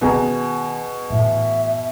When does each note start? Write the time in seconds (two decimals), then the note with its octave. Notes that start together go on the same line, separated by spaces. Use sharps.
0.01 B2 D#3 C#4 G#4 A#5
1.10 A2 E3 E5